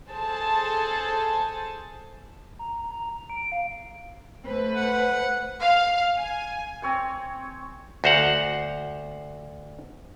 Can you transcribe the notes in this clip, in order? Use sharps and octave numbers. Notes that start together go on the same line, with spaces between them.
G#4 A4 C5 A5
A#5
A#5
D7
F5
A3 B4 C5
F#5
F5
G#5
C4 C#5 G#5
D2 F#4 C5 F5 F#5